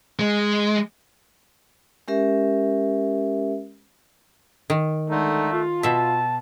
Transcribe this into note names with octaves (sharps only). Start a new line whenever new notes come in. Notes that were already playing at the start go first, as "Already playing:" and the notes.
G#3
G#3 C#4 G4 A#4 E5
D#3
D3 G#3 A3 D#4
F4
B2 E5 A5